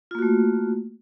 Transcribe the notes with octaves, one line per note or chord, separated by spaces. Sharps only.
A3 A#3 F4 F#4